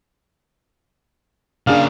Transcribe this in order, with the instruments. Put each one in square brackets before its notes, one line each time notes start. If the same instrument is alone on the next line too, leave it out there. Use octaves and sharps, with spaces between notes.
[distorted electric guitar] C#3 A#3 [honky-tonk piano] D4 G#4 [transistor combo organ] F5